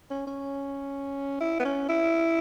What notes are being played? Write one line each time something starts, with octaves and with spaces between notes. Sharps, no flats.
C#4
C#4
E4
B3
C#4
E4